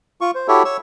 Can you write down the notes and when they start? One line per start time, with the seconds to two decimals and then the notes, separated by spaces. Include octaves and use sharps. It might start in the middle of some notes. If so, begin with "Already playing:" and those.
0.21 F4 C#6
0.35 C5
0.48 E4 F#4 G4 A4 C#5 E5
0.65 C#5 C#6 E6